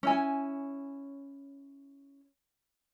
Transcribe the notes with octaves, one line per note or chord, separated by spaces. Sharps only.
C#4 E4 G#5